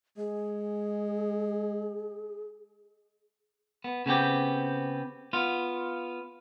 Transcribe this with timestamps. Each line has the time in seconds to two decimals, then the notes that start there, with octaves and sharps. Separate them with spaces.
0.17 G#3 G#4
3.84 B3
4.06 C#3 B3 C4 G4
5.33 B3 F4